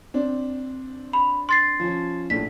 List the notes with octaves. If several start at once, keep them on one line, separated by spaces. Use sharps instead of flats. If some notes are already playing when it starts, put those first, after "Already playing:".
C4 D4
B5
C6 A6 C7
F3 C#4
A#1 A2 B6